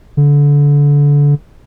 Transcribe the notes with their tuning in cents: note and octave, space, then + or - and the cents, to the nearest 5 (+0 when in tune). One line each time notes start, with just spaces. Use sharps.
D3 -25